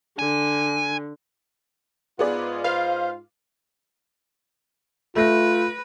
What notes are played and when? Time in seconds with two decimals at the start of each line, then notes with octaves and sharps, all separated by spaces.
0.19 D3 G#5
2.19 G#2 B3 F4 G#4 B4 D5
2.64 B4 C5 F5
5.16 A3 F4 B4 A#6